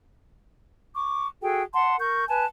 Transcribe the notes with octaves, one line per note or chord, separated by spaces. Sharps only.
C#6 D6
F#4 G#4 A4 G5
F#5 A5 C6
A#4 C#6 G6
B4 G#5 A5